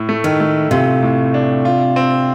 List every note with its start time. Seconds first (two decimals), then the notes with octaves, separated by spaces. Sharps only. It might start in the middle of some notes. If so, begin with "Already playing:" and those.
Already playing: A2
0.09 A3
0.24 D#3
0.40 A3
0.71 C3 F4
1.02 A2
1.34 D4
1.65 F4
1.96 C4